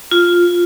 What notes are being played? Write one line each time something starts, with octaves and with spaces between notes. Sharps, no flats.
F4